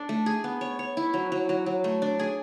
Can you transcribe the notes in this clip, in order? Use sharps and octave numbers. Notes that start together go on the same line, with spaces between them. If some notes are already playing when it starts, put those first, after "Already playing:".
Already playing: D4 A4
A3
G#4
B3
C#5
C#5
E4
F#3
F#3
F#3
F#3
A3
D4
G#4